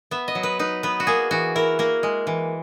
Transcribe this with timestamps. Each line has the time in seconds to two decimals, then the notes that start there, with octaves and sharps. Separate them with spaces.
0.11 B3 E5
0.28 D#5
0.35 F#3
0.43 B4
0.59 D#4 B4
0.83 B3 B4
1.00 F#4
1.07 A#3 G#4
1.31 E3 F#4
1.56 E4 A#4
1.79 A#3 A#4
2.03 G#3
2.27 E3